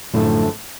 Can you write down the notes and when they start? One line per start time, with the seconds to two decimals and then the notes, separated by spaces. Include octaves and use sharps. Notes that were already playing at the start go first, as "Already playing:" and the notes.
0.14 F#2 A2 D3 F3 A3